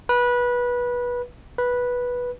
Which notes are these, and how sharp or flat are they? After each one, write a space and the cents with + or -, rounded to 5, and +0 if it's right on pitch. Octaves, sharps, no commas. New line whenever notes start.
B4 -20
B4 -10